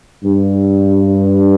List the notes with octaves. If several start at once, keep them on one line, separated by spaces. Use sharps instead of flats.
G2